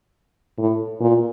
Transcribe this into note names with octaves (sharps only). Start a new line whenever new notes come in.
A2
A#2